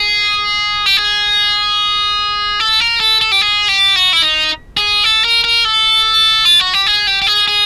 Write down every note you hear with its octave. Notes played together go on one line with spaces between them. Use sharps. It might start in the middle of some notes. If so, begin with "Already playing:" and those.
Already playing: G#4
G4
G#4
A4
A#4
A4
A4
G4
G#4
G4
F#4
E4
D#4
G#4
A4
A#4
A#4
A4
F4
F#4
G4
G#4
G4
G4
G#4
G#4